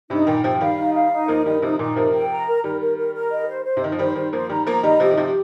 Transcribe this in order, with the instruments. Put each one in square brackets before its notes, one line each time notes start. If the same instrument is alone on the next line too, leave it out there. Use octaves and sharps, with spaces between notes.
[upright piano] G2 C3 [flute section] D#4
[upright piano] A#2 D#3 [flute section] G5
[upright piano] C3 F3 [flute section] G5
[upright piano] F3
[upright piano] D#3 G3 [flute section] F5
[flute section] D#4
F5
D#4
[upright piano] F3 A#3 [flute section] A#4
[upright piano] D#3 G3 [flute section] D#4
[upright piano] C3 F3 [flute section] D#4
[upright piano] A#2 D#3 [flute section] D#4
[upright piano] C3 F3 [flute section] A#4
[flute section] G5
A#5
A#4
[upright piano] D#3 G3 [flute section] A#4
[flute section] A#4
A#4
A#4
D#5
C5
C5
[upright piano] C3
[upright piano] D#3 [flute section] D#5
[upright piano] F3
[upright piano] D#3 G3 [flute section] C5
[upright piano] D#3 G3 [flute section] C5
[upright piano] F3 A#3 [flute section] C5
[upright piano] D#3 G3 [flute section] A#5
[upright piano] F3 A#3 [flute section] A#5
[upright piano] D#3 G3 [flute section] D#5
[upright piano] C3 F3 [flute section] G4
[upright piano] D#3
[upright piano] C3 F3 [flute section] G4